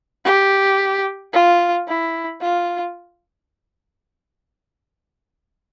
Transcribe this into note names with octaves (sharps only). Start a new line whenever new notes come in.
G4
F4
E4
F4